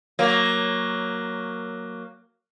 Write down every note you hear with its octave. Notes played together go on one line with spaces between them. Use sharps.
F#3 A#3